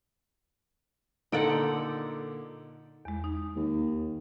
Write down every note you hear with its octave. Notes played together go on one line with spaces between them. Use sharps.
A#2 D3 D#4 A4 F#5 D7
E2 G#3
D#4
D#2